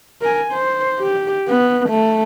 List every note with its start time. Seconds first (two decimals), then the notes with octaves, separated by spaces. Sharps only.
0.22 A#4 G#5
0.52 C5
0.99 G4
1.48 B3
1.89 A3